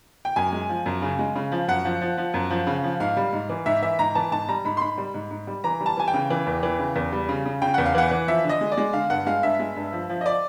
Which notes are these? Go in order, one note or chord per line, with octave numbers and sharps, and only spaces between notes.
G5
F#2 G#5
G#3
F3
F#2
C#3
G#3
C#3
F3
F#2 F#5
F3
F3
F3
F#2
F3
C#3
F3
G#2 F5
G3
G#2
E3
G#2 E5
E3 E5
G#2 A#5
E3 A5
G#2 A5
G3 A#5
G#2 B5
C6
G#2 B5
G3
G#2
G#2
G3
E3 A#5
G3
A5
E3 G#5
G5
C#3
E3
E2
E3
C#3
E2
G3
C#3
C#3
C#3 G5
E2 F#5
F5
E3 F#5
E3
F3 E5
D3
D#5
G#3
D5
G#3
D3 F5
G2 F#5
G#3 F5
G2 E5
G#3
G2
F3
F3
D#5
D5